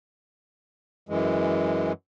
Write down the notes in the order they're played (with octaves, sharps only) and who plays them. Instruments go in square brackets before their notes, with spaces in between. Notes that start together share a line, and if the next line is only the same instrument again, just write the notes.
[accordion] F#2 E3 G#3